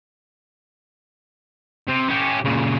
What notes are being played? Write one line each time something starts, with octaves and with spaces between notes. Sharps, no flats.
C3
C#4 G4
A#2 C#3